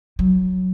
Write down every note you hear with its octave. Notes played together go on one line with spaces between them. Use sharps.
F#3